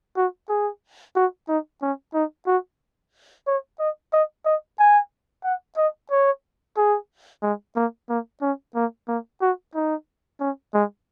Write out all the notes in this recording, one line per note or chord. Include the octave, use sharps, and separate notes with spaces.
F#4
G#4
F#4
D#4
C#4
D#4
F#4
C#5
D#5
D#5
D#5
G#5
F#5
D#5
C#5
G#4
G#3
A#3
A#3
C#4
A#3
A#3
F#4
D#4
C#4
G#3